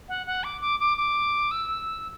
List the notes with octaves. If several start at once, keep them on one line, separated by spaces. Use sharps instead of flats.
F#5
F#5
D6
D6
D6
D6
E6